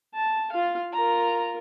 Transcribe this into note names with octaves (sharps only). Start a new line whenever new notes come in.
A5
F4 F5
F4 A#4 A#5